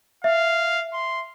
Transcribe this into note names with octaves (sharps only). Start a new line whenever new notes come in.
E5 F5
C6